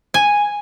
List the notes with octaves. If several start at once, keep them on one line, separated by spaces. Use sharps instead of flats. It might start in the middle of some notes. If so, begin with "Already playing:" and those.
G#5